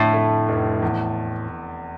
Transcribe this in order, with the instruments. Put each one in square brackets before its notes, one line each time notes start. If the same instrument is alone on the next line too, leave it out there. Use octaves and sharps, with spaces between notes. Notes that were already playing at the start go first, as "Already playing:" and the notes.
Already playing: [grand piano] F2 D3 [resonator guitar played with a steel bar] A2
[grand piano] A3
F1
E2